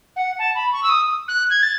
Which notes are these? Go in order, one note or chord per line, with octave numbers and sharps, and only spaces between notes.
F#5
A5
B5
C#6
E6
D#6
F#6
G#6
A6